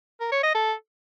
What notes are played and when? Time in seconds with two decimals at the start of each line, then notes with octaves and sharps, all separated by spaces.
0.20 A#4
0.32 C#5
0.43 D#5
0.54 A4